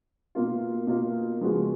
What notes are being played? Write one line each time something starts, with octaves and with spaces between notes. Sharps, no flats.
B2 A#3 F4
B2 A#3 F4
C#3 F3 G#3 B3 F#4